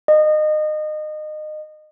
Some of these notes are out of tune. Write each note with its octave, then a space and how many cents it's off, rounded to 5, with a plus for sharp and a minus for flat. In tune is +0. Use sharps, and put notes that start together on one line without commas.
D#5 -25